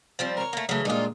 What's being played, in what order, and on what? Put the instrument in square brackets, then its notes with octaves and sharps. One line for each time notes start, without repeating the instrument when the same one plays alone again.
[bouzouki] F3 G3 C4
[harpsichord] A#4 C#5
[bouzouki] A3 A#3
[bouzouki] C#3 E3 [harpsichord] F#3 A3
[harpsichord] G2 A#2 G#3 [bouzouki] D#4 F4